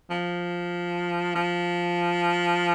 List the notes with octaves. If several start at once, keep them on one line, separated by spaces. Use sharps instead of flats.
F3
F3